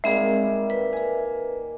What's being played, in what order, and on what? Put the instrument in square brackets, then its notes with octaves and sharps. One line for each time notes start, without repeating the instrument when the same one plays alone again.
[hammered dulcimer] D#3 G3 A#3 [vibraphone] G#3 C4 G#4 [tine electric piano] E5
[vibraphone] B4
[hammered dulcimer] A#3 G#5